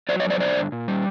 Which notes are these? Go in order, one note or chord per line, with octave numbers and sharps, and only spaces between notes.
F#3 C5 D5
C#5 D#5
F#2
C5 D5
D3 C5 D5
G2
A#2
G3